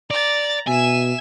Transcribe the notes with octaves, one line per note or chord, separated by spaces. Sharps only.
D5 A#5 A6
B2 E5 G#5 E7